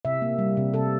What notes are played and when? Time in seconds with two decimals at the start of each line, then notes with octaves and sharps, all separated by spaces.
0.05 C3 E5
0.22 A#3
0.39 G3
0.57 C3
0.74 C3 A4